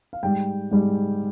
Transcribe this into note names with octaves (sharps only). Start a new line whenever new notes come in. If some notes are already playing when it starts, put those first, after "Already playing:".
F5
G#2 G3 G5
G#2 G3